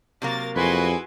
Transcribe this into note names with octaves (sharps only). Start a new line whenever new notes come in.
C3 F#3 A#3 A#4 A6
F2 E4 F#4 G#4 B4 G#5 C6